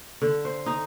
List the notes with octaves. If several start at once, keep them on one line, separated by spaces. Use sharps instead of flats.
D3
C5
D#4